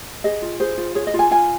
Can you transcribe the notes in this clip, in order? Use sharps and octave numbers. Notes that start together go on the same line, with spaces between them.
G#4 D#5
F4
G#4 C5
F4
G#4 C#5
D#5
F4
G#5
F4 G#5